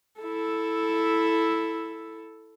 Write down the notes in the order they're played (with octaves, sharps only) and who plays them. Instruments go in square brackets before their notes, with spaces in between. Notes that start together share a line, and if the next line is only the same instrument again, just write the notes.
[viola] E4 A4